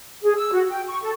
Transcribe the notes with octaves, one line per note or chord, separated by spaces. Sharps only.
G#4
E6
F#4
G5
C#6
A4